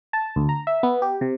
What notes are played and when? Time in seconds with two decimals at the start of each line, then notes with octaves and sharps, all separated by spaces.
0.13 A5
0.36 D2
0.49 A#5
0.67 E5
0.83 B3
1.02 G4
1.21 C3